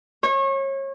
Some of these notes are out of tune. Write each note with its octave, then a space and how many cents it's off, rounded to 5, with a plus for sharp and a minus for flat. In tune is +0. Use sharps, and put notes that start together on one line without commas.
C#5 -30